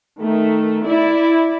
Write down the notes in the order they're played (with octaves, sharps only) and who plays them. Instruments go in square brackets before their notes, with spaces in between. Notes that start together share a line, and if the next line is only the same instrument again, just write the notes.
[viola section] D#3 A3
E4 D5